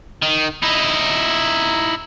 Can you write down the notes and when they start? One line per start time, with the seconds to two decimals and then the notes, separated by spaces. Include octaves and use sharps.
0.22 D#3
0.62 D#4 E4